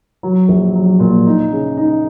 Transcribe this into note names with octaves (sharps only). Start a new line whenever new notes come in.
F#3
A#1
F#3
A#2
D#4
C#3
D#4